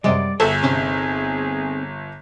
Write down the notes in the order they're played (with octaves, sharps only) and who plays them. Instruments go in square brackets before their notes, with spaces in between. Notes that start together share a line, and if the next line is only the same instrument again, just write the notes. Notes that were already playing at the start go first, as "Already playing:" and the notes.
[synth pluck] F#2 C3 G#3 [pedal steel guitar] G3 [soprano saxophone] D5
[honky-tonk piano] G1 [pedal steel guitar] F#4 E5 [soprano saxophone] G#4 [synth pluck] A4
[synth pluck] C3 C#4 [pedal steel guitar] C4 D#4 F6